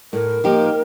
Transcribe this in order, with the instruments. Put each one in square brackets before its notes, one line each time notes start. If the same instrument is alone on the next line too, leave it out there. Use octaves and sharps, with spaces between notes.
[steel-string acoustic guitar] A2 [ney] A#4
[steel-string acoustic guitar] F3 A#3 D#4 G4